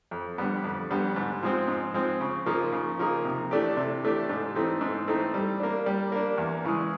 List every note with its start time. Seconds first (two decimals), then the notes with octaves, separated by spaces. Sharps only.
0.11 F2
0.38 D3 G3 B3
0.64 F2
0.90 D3 G3 B3
1.16 G#2
1.43 F3 G#3 C4
1.68 G#2
1.94 F3 G#3 C4
2.21 C#3
2.46 F3 A#3 D#4 G#4
2.72 C#3
2.99 F3 A#3 D#4 G#4
3.25 C3
3.51 E3 A3 D4 G4
3.77 C3
4.03 E3 A3 D4 G4
4.29 G#2
4.55 E3 A3 C4 D#4
4.81 G#2
5.08 E3 A3 C4 D#4
5.34 G3
5.60 A#3 D4
5.86 G3
6.12 A#3 D4
6.38 E2
6.65 C#3 E3 G#3